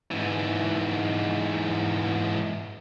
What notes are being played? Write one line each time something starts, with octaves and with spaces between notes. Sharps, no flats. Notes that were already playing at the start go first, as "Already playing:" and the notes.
G#2 E3